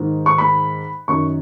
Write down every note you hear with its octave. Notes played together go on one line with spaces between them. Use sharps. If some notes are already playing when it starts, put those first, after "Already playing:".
Already playing: G#2 D#3
C#6
B5
F#2 D#3 C#6